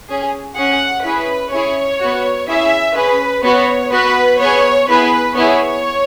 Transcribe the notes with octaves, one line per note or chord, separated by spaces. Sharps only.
C#4 G#4
C#4 G#4 F#5
C#4 E4 G#4 B4
C#4 E4 G#4 C#5
F#4
B3
C#4 E4 G#4 E5
C#4 G#4 B4
B3 F#4 C#5
B3 F#4 B4
B3 G#4 C#5
B3 E4 G#4 B4
B3 E4 G#4 C#5